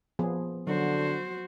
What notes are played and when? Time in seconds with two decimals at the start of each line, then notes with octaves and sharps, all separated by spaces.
0.19 F3 B3 G#4
0.67 D3 F#3 F#4 C5